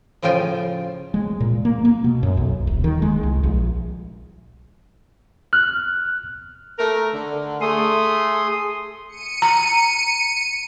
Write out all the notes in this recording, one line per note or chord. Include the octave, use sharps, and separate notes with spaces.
A2 C#3 F3 F4 G5 G#5
G#3
A#2
A#3
A#3
B2
F#2
B1
D#1
D#3
G#3
C2
A#1
F6 F#6
A3 A#4
D3
A3 G#4 C6 D#6
C#7 D#7
A#5